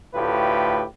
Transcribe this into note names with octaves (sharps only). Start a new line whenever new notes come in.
D2 A2 F4 G4 B4